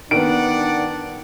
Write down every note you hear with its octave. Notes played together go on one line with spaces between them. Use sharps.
D#3 B3 D4 D5 F#5 D7